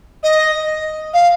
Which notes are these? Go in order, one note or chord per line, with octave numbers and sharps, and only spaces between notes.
D#5
F5